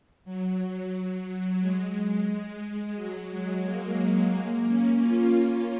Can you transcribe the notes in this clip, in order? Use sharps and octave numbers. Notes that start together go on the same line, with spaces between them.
F#3
G#3
F#3
G#3
A#3
G#3
A#3
C#4
F4
F4